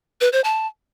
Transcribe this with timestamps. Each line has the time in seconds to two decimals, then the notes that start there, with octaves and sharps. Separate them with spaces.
0.21 B4
0.33 C5
0.44 A5